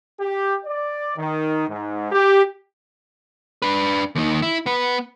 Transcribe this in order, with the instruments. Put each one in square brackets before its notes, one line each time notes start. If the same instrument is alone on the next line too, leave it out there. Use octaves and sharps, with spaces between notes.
[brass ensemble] G4
D5
D#3
G#2
G4
[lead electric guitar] D4 B4
D#2 D#3
E4
B3 B4